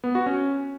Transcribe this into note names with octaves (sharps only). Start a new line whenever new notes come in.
B3
F#4
C#4